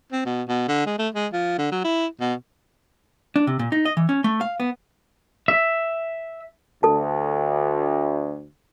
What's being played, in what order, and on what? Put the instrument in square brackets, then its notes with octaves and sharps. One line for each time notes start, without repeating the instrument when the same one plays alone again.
[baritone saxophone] C4
B2
B2
D3
G#3
A3
G#3
F3
D3
F#3
E4
B2
[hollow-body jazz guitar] D4
C3
A#2
D#4
D#5
E3
C#4
A3
F5
B3
[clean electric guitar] E5
[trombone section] D2 [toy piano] A4 A5